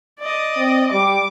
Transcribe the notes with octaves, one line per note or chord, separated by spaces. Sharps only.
D5 D#5
C4
G3 D6